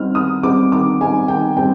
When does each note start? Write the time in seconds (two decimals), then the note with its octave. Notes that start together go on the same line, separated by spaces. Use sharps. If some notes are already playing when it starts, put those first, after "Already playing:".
Already playing: D#3 G3 C4 D#4 F6
0.14 D#3 D#6
0.43 G3 C4 D#4 D6
0.72 D#3 D6
1.00 G3 C4 D#4 G#5
1.28 D#3 G5
1.57 G3 C4 G5